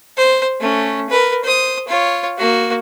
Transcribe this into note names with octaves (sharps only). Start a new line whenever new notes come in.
C5
A3 C#4
A#4 B4
C5 D#6
F4 C#5
A#3 F#4